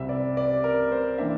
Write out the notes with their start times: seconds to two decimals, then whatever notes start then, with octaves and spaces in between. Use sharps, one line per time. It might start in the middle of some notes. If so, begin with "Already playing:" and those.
Already playing: C2 C3 G3 C4 E5
0.09 D5
0.37 D5
0.64 A#4
0.92 C5
1.18 E3 A#3 D4 E5